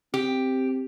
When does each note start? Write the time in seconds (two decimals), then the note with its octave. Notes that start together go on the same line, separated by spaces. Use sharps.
0.14 C4 G4